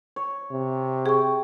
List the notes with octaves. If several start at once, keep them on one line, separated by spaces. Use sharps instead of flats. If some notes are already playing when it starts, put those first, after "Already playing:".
C#5
C3
G#4 G5 C#6